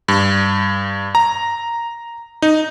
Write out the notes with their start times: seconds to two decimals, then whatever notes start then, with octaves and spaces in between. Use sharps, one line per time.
0.08 G2
1.15 A#5
2.42 D#4